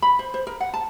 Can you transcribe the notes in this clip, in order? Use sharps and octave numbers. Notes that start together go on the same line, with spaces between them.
B5
C5
C5
A#4
F#5
A5